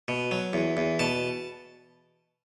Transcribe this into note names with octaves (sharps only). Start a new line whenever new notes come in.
B2
F#3
E2
E2
B2 A5